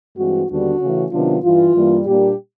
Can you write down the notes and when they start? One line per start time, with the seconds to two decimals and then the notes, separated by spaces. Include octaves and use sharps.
0.17 G2 E3 G#3 C4 F#4
0.49 D#2 D3 G3 B3 D4 F#4
0.80 C#3 E3 A3 C#4
1.12 C3 D#3 F#3 B3 D4 F4
1.43 G2 E3 G3 F4
1.74 G2 E3 G3 A#3
2.06 A#2 G3 A#3 D4 G4